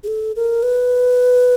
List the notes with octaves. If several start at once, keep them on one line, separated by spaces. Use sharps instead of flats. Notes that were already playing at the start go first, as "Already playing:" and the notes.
G#4
A4
A#4
B4